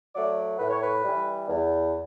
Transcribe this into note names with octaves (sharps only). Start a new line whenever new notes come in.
F#3 A3 D5
A2 B4
C#5
B4
E3 G3
E2